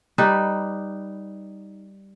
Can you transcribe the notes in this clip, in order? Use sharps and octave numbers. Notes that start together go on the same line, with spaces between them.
G3 D#4 B4